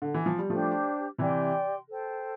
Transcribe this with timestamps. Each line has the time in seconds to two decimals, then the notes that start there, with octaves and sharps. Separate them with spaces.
0.02 D3
0.14 E3
0.26 F3
0.38 G3
0.50 F3 A3 D4 G4 C5
1.18 C3 E3 G4 D5 G5 C6
1.88 A4 C5 G5